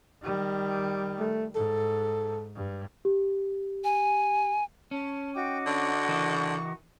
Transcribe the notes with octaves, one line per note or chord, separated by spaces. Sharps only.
D#3 G3
A3
G#2 A4
G2
G4
G#5
C#4 A5
D#4 F#4 G5 D6
D3 C#6
E3 A#4